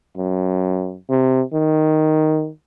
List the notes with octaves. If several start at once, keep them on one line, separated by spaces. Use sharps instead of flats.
F#2
C3
D#3